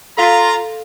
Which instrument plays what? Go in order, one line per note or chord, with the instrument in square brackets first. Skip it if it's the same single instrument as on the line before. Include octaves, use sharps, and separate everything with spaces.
[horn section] F4 A#5 [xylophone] A4 F5 B6